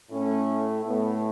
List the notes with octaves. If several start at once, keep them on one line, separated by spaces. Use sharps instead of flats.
A2 A3 C#4
A2 A3 B3